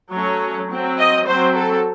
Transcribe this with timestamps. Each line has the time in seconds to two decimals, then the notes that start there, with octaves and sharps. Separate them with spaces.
0.12 F#3 A3 C#4 C#5
0.70 F#3 C4
0.98 D#5
1.26 F#3 C4 C5
1.56 A4